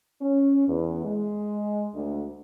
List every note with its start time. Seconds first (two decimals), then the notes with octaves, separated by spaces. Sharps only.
0.22 C#4
0.68 E2
1.05 G#3
1.95 D2